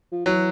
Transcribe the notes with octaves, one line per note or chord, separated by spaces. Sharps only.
F3
E3 F#3